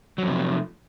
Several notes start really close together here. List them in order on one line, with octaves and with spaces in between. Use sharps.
F#3 F2 C3 F3 A3